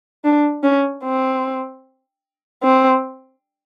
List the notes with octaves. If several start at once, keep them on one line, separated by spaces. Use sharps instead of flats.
D4
C#4
C4
C4